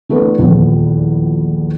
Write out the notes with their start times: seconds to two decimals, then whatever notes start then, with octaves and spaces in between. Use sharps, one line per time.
0.09 E3 A3 B3 D4 B4
0.38 D#1 A#1 E2 F3 B3